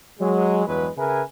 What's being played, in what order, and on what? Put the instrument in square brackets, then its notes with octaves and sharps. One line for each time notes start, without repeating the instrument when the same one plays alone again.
[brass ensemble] F#3 G#3
E2 G2 F#3 G#3 B4
C#3 G#4 A#4 B4 E5 G#5